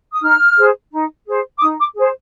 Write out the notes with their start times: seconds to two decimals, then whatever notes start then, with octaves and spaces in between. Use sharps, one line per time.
0.11 D#6
0.22 D#4 F6
0.58 G#4 C5
0.91 D#4
1.27 G#4 C5
1.58 D6
1.61 D#4 D#6
1.79 D6
1.95 G#4 C5